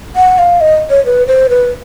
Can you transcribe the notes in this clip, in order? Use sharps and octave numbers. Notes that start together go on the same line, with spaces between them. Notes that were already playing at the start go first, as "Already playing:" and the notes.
F#5
F5
D#5
C#5
B4
C5
B4